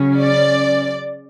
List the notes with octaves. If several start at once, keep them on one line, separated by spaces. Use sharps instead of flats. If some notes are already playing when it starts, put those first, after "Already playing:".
Already playing: C#3 F#3 C#4
D5